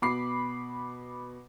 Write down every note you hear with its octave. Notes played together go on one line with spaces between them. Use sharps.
B2 B5 D6 C7